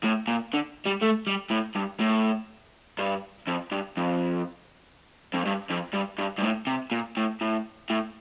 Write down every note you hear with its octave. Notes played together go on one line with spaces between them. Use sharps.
A2
A#2
D3
G3
A3
G3
A2
G2
A2
G2
F2
G2
F2
F2
G2
F2
G2
G2
G2
A2
C3
A#2
A2
A2
A2